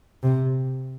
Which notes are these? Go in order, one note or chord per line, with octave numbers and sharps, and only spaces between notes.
C3